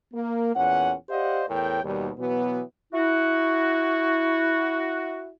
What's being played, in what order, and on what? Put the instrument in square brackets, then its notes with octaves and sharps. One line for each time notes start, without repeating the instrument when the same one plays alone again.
[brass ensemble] A#3
E2 A#2 C#4 F#5
G4 C5 D5 D#5 F5 F#5
E2 A2 A#4 C#5 G5
D#2 B2 G3
B2 E3 F#3 B3
[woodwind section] E4 F#4